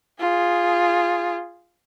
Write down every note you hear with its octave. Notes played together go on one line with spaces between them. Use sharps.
F4 G#4